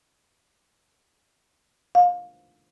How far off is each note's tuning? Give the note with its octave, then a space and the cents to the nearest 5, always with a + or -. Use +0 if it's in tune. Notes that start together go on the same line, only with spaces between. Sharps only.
F5 +25